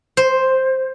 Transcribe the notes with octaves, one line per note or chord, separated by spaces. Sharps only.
C5